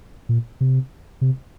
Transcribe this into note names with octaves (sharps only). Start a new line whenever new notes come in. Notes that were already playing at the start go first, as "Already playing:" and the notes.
A#2
C3
C3